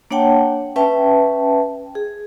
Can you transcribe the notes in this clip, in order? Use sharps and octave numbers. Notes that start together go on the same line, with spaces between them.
A#3 D4 C#5 F#5 G5 A5
C#4 B4 E5 G5 A5
G#4